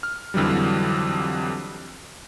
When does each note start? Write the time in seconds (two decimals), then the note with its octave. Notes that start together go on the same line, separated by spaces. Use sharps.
0.03 F6
0.34 F2 D3 E3 F#3 G3